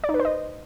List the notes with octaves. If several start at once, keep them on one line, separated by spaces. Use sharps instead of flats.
D5
D#4
B4
C5
D#5